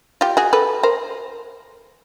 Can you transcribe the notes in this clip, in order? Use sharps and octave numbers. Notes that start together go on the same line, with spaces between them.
F4 G4
F#4 G#4
A4 B4
A#4 C5